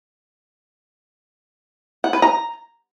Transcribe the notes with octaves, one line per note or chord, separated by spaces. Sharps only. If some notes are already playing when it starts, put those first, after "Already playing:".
F#5
B4
A#5